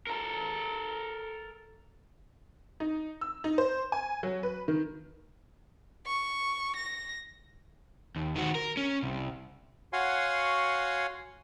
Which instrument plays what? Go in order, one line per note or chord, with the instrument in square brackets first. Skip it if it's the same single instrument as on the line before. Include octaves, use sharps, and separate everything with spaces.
[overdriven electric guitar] A4 A#4
[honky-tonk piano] D#4
E6
D#4
C5
G#5
F#3
B4
D#3
[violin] C#6
A#6
[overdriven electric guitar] D#2
D#3 F#4
A#4
C#4
C2
[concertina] F#4 C#5 F5 F#5 G#5 C6